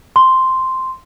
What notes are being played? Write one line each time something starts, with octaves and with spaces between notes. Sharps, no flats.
C6